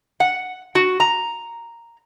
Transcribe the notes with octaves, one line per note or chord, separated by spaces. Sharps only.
F#5
F#4
A#5